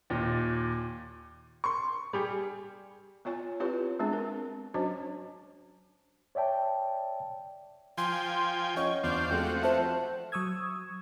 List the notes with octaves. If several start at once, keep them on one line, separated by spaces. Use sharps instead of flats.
D#2 A#2
C6 C#6
G3 G4 G#4
B3 F4 C#5 G#5
C4 E4 F4 G4 B4 C#5
G#3 B3 C4 D4 G#4
C4 A#4
F#3 C#4 D4 F#4 C5 D#5
C#5 D5 E5 G5 A5
F3 G5 G#5 C6
C#4 D#5 F#5 C#6
E2 D4 F4 C5 G6
F3 G#3 A3 C4 F#4
C5 E5 A5
F#3 C#6 D#6 E6 G#6